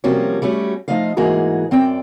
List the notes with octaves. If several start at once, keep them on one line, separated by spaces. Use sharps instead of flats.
C3 F3 G3 A#3 C#4 F#4
G3 A3 C#4 F#4
F3 A3 D#4 D#5 F5
G#2 E3 A#3 F#4 G#4 A#5
F#2 C4 D5 G5